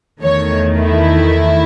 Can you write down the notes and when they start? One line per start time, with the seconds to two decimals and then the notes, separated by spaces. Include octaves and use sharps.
0.22 E2 D#3 A3 C#5
0.80 E4